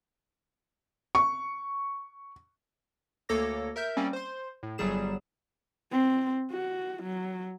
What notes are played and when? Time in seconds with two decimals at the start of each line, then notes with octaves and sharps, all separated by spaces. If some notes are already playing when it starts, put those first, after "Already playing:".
1.15 C#6
3.29 D2 A#3 A4 C#5 D6 A#6
3.76 A#4 E5 G6
3.97 G3 A#3 C4 C#4
4.13 C5 C6
4.63 A2
4.78 G1 F#3 G3 G#4 E7
5.92 C4
6.52 F#4
7.03 F#3